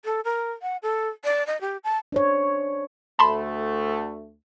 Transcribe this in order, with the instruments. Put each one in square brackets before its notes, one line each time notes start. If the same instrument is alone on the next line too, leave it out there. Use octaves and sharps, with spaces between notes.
[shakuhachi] A4
A#4
F#5
A4
D5
D#5
G4
A5
[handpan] D4 C5 C#5
[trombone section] D2 A3 [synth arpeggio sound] A5 B5 C6